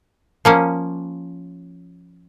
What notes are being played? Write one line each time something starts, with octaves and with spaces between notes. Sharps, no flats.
F3 A#3 C#4